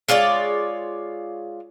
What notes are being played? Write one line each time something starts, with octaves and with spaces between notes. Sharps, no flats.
G#3 F4 C#5 D5